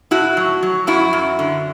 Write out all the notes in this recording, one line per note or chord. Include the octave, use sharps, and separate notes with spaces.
A2 E4 F#4
F#3
F#3
F#2 E4 F#4
F#2
D3